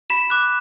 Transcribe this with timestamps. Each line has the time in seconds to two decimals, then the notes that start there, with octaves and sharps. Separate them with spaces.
0.10 B5 B6 E7
0.30 D6 F#6